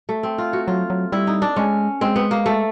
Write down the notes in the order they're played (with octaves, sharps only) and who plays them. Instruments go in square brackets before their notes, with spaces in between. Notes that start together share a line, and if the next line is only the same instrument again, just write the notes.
[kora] A3
C4
F4
F#4
[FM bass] F#3 [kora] F4
[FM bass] F#3
[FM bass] G3 [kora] E4
[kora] D#4
D4
[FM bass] G#3 [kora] C#4
[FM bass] G#3 [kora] C4
[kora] B3
A#3
A3